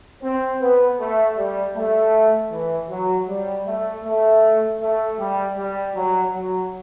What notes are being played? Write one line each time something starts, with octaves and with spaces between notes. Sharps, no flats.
C4
B3
A3
G3
A3
E3
F#3
G3
A3
A3
A3
G3
G3
F#3
F#3